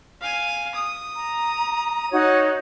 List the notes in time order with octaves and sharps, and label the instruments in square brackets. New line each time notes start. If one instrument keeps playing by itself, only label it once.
[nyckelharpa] F5 G#5
D#6
[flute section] A#5
D#4 F#4 C#5